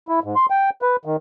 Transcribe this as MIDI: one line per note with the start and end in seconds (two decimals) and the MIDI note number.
0.08 0.20 64
0.24 0.35 44
0.36 0.46 84
0.50 0.70 79
0.82 0.96 71
1.05 1.16 51